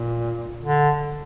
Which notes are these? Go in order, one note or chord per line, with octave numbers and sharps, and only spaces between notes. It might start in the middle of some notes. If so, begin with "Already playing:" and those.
Already playing: A#2
D3